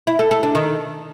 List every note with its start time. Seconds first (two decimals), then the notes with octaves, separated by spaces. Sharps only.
0.07 E4
0.19 A4
0.31 A4
0.43 D4
0.55 D#3